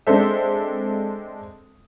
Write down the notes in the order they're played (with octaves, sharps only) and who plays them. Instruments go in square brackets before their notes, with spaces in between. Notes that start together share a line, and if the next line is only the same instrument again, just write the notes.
[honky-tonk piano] G#3 C4 D4 A4 C5 E5